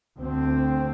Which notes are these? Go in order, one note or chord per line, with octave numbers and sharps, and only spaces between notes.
D2 C4